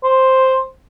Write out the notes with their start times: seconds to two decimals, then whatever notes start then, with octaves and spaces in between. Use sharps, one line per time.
0.04 C5